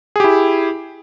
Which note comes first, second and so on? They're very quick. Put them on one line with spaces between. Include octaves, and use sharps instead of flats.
G#4 G4 E4